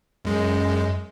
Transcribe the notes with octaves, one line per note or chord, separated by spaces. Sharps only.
F#2 G#3